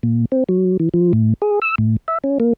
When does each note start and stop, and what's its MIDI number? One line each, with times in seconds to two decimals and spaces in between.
0.03 0.25 46
0.32 0.44 60
0.49 0.77 54
0.80 0.89 52
0.94 1.12 53
1.13 1.34 45
1.42 1.59 68
1.62 1.75 88
1.78 1.96 45
2.08 2.18 76
2.24 2.38 61
2.40 2.53 58